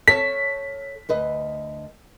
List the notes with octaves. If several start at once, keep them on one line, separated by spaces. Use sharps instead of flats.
A4 C#5 A5 B6
D2 B4 D#5